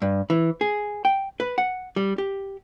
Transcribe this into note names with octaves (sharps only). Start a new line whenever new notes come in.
G2
E3
G#4
G5
B4
F#5
G3
G4